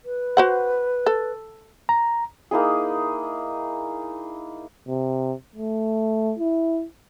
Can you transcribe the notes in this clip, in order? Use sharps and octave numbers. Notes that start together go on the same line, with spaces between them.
B4
F#4 C5 F#5
A4
A#5
A#3 D#4 E4 G#4
C3
A3
E4